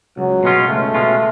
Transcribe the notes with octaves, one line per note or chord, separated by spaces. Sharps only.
C#2 F#3
B2 G#3 C#4 F4
C#2 A3
B2 G#3 C#4 F4